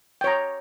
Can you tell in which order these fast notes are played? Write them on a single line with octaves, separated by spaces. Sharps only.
G5 C#5 A#5